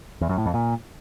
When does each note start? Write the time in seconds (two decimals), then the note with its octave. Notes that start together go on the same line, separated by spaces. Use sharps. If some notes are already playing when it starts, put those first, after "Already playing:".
0.21 E2
0.29 F#2
0.38 A2
0.46 F2
0.54 A#2